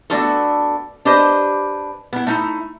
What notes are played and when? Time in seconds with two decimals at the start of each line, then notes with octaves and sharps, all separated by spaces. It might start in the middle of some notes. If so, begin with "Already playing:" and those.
0.10 A3 B3 D4 F4 F#4 A4
1.05 D4 G4 B4 C5 D#5
2.13 B3 E4
2.27 A3 D#4 E4